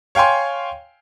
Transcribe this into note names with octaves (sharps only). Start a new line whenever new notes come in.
C#5 F5 G5 G#5 C6